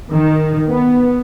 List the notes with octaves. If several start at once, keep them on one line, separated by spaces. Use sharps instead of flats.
D#3
B3